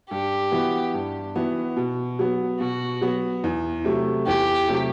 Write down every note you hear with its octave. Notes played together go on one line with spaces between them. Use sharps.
G2 G4
E3 B3 F#4
G2
E3 B3 F#4
B2
F#3 B3
B2 F#4
F#3 B3
E2
C3 F#3 A3
E2 G4
C3 F#3 A3